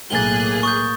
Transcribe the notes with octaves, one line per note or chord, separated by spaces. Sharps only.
B1 A2 A#3 G#4 F#6 A6 G7
C#6 D#6 G6